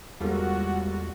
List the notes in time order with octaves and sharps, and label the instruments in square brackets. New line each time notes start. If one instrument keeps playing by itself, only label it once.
[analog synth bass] E2 [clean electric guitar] G3 F4 [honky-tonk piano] G#3 A#3 A4 [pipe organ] F#4